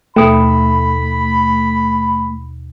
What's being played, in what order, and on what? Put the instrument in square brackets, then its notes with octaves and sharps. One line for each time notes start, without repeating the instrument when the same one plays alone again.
[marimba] D#2 B2 [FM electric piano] A3 [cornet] B5